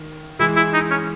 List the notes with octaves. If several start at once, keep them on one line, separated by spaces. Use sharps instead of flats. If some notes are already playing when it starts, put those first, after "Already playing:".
Already playing: D#3
E3 G#3 E4
E4
D#4
C#4